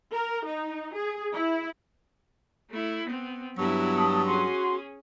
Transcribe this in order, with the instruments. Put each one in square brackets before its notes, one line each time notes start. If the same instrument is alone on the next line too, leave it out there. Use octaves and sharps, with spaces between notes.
[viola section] A#4
D#4
G#4
E4
[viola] A3 E4
B3 C4
[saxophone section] G2 F#3 [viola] B3 E4
[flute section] A5 D#6
[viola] C#4 G#4 [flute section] F#4 C6